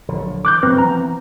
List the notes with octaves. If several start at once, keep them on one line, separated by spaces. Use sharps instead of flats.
A#1 D3 F#3
E3 D6 F#6 G6
F#2 C3 F3 C4 B4
E3 F3 B3 A#5